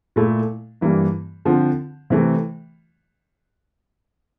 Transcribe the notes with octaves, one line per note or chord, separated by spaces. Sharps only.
A#2 A3 E4
G2 E3 G3 A#3
D3 F3 C4
C3 E3 A3